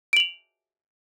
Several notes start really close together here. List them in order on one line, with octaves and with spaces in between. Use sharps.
D7 F#7 F7